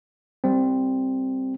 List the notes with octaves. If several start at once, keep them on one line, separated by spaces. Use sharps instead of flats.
G3 C4